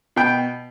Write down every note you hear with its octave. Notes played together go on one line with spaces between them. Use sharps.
B2 G5